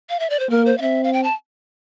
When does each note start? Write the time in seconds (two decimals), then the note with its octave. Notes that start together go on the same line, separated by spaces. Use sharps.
0.10 F5
0.20 E5
0.30 D5
0.40 C5
0.50 A#3 A#4
0.66 C5
0.78 F5
0.81 C4 E5
1.04 F5
1.13 G5
1.24 A5